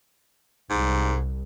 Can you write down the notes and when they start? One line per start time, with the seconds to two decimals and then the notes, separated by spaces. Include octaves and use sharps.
0.70 C2 G#2